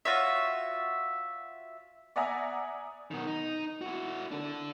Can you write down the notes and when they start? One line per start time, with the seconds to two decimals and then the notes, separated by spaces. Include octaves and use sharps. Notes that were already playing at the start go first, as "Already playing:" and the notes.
0.05 F4 F#4 C#5 E5
2.16 D5 E5 F#5 G#5 A#5 D#6
3.11 B2 D#3
3.27 D#4
3.81 E4 F#4
4.31 D4 A4